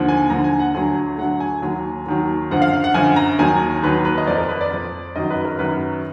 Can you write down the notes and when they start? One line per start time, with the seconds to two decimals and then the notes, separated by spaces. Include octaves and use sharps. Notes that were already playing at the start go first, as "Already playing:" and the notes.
Already playing: D#2 D3 F3
0.09 G#5
0.30 D#2 D3 F3 A#5
0.44 G#5
0.60 F#5
0.74 D2 D3 F#3 G#5
1.18 D2 D3 F#3 F#5
1.40 G#5
1.62 D#2 D#3 F#3
2.06 D#2 D#3 F#3
2.51 F#2 D3 F3 F#5
2.62 F5
2.73 F5
2.84 F#5
2.94 F#2 D3 F3 G#5
3.16 A#5
3.38 D#2 D#3 F#3 G#5
3.83 D#2 D#3 F#3 B4
4.05 B4
4.18 D#5
4.27 F2 F3 D5
4.38 A#4
4.49 B4
4.61 D5
4.71 F2 F3
5.16 F#2 D#3 F#3 D#5
5.31 B4
5.45 A#4
5.59 F#2 D#3 F#3 B4